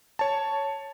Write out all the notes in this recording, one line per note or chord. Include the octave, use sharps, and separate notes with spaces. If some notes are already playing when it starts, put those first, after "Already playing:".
C#5 A5